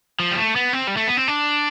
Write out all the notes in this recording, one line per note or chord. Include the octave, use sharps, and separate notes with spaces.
F3
G3
A3
B3
C4
G3
A3
B3
C4
D4